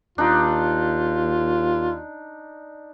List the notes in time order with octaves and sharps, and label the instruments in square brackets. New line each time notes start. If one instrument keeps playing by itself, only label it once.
[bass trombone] D#2 [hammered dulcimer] D4 D#4 [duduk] F4